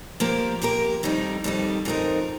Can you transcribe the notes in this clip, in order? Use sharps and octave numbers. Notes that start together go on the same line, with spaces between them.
F3 A#3 G4 A#4
F3 A#3 G4 A#4
F2 D#3 G3 D#4
F2 D#3 G3 D#4
F2 F3 D#4 A#4